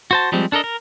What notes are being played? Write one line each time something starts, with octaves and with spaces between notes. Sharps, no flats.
F#4 C5 A5
F3 G3 G#3 C4
D4 A4 A#4 D#5
A#4